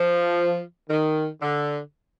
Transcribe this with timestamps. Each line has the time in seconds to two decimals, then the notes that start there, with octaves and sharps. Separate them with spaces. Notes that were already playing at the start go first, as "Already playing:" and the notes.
Already playing: F3
0.90 D#3
1.41 D3